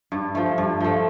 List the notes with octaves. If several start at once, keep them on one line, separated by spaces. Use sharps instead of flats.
G2
F3 A3
G2
F3 A3